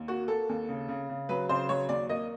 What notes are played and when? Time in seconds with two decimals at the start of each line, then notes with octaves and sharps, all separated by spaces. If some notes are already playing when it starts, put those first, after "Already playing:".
Already playing: D#2
0.08 A#3 F#4
0.28 A#3 A4
0.49 D#2
0.69 C#3
0.89 C#3
1.09 C#3
1.29 F#3 B4
1.49 C#3 C5
1.69 F#3 C#5
1.89 D#2 D5
2.09 A#3 D#5